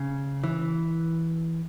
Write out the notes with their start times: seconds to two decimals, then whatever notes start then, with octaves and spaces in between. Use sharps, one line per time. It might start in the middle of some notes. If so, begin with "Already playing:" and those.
Already playing: C#3
0.44 E3